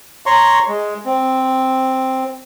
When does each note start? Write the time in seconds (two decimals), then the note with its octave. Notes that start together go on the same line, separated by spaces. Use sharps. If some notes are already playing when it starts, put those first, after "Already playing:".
0.26 C#5 A#5 C6 C#6
0.68 G#3
1.05 C4